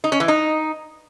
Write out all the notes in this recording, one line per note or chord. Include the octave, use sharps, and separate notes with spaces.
D#4
C#4
E3
D#4